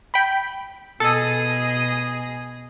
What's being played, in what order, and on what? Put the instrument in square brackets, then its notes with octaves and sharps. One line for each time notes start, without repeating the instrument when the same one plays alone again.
[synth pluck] G5 B5
[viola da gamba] B2 G#4 D#5 [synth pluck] A4